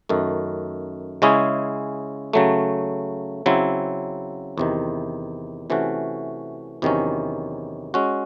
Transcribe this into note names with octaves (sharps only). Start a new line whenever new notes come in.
F#2 D#3 A3
C#3 G#3 C#4 E4 G#4
C#3 F#3 A3
C#3 F#3 C4 E4
E2 C3 D#3
C3 E3 A3 C#4 F#4
E2 C3 D#3 F#3 C#4
G#3 C#4 F#4